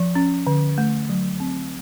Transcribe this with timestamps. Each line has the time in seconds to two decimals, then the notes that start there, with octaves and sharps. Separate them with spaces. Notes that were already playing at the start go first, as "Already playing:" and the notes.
Already playing: F3
0.15 C#4
0.47 D3
0.78 A3
1.09 F#3
1.40 C4